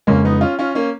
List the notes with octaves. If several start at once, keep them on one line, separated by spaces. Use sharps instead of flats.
F2 C#3 G#3 A#3 C#4
B3 D#4
C#4 F4
C#4 F4
A#3 C#4